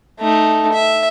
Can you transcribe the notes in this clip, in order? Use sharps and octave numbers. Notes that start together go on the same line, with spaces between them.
A3 D#4
E5